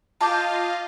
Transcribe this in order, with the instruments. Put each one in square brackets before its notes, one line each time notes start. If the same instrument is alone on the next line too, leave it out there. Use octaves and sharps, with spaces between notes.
[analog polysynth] F4 D#5 F5 [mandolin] A5 D6 G6